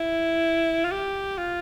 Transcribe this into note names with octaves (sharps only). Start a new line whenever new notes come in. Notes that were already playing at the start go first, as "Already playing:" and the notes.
Already playing: E4
F4
G4
F4